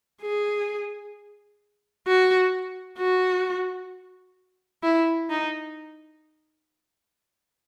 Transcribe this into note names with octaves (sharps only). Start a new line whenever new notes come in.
G#4
F#4
F#4
E4
D#4